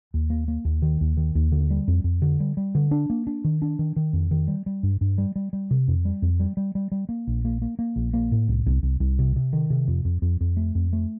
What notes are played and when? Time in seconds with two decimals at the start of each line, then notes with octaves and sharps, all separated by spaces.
0.14 D#2
0.30 A#3
0.48 A#3
0.65 D#2
0.82 D#3
1.01 D#2
1.17 D#3
1.35 D#2
1.52 D3
1.70 G3
1.88 F2
2.04 F2
2.22 D3
2.40 G3
2.57 G3
2.75 D3
2.91 D4
3.10 A#3
3.27 D4
3.44 D#3
3.62 D4
3.79 D#3
3.96 D#3
4.13 F2
4.31 D#3
4.48 G3
4.66 G3
4.83 G2
5.01 G2
5.18 G3
5.36 G3
5.53 G3
5.71 C3
5.88 F2
6.05 G3
6.22 F2
6.40 G3
6.57 G3
6.75 G3
6.92 G3
7.09 A#3
7.27 A#1
7.45 A#3
7.62 A#3
7.79 A#3
7.96 A#1
8.14 A#3
8.32 A2
8.48 C2
8.66 C2
8.83 C2
9.00 C2
9.19 C3
9.36 C3
9.53 D#3
9.70 C3
9.88 F2
10.05 F2
10.22 F2
10.41 F2
10.57 A3
10.75 F2
10.93 A3